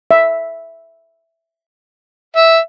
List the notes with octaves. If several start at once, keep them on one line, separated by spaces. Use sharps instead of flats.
E5
E5